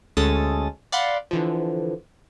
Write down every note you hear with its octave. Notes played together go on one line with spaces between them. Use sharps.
D2 G#3 C#4 A4 D#6 A6
D5 F5 F#5 B5 C6
D3 E3 F3